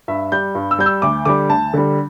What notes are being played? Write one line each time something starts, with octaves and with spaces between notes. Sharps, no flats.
G2 E5
G3 G6
G2
E6
G3 G6
E6
D2 D6
D3 G3 D6
D2 A5
D3 G3